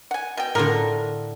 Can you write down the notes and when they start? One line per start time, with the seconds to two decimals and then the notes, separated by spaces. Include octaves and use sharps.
0.11 F#5 G#5
0.37 B2 G5
0.55 A2 D3 F4 A#4